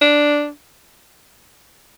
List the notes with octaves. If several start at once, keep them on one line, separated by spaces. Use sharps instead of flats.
D4